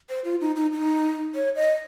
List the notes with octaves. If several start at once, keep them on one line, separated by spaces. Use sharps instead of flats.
C5
F4
D#4
D#4
D#4
C#5
D#5